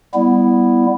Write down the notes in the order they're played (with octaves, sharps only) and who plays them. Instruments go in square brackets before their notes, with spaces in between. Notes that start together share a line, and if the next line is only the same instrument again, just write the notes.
[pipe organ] G3 B3 E4